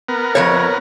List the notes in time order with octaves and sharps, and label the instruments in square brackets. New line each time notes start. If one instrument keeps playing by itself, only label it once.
[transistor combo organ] B3 A#4
[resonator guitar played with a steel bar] F2 E3 C#5